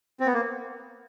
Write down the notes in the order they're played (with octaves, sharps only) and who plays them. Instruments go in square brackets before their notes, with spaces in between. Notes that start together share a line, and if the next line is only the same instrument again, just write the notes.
[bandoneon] C4
B3
A#3